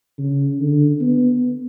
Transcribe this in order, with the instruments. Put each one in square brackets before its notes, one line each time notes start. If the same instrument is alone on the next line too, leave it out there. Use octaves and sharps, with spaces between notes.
[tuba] C#3
D3
B3